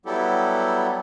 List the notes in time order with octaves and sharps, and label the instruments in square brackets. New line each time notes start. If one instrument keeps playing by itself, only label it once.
[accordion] F#3 G3 B3 E4 G4 A4